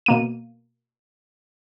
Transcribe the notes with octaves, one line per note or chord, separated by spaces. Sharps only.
B2 A#3 D#7